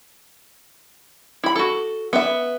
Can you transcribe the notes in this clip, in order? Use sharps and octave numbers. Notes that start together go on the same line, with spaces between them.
E4 B5
F#4 A4
B3 E5